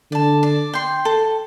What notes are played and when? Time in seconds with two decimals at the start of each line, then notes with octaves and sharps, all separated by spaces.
0.11 D3 D5 A5
0.43 D5
0.73 G5 C6
1.05 A4